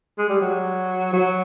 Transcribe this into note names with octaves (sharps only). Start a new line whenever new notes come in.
G#3
G3
F#3
F#3